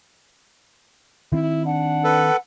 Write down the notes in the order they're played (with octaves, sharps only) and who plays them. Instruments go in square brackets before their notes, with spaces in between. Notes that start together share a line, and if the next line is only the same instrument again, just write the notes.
[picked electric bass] D#3 C4 [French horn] E4
[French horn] D4 [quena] F#5
[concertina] A4 B4